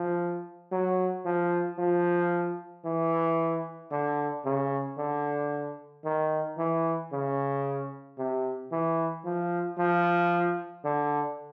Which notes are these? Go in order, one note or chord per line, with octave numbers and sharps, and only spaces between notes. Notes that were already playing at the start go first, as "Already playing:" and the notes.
Already playing: F3
F#3
F3
F3
E3
D3
C#3
D3
D#3
E3
C#3
C3
E3
F3
F3
D3